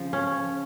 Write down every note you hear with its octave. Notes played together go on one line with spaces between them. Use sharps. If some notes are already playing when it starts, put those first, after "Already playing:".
Already playing: C#3 F3
C#4